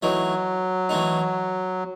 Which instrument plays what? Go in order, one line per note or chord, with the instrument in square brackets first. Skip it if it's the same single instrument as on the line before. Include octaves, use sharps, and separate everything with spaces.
[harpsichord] E3 A3 D#4 [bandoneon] F#3
[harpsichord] E3 A3 D#4